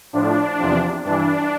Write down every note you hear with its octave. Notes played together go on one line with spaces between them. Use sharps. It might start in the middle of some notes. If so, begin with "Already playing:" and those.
A2 F3 D4
E2 C3 F3
G2 E3 D4